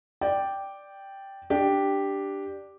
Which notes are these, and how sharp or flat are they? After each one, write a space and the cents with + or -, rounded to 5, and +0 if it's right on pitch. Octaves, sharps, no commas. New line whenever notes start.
D5 +0 G5 +0
D4 +0 G4 +0